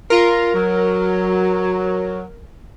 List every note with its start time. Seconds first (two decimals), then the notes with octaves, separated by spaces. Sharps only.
0.10 F4 A#4
0.54 F#3